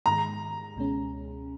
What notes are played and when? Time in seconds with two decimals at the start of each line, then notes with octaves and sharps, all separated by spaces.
0.06 G#2 D#3 G#3 A#5
0.76 C#2 B2 G#3 C#4